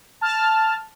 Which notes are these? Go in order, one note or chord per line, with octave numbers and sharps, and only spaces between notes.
A5 F6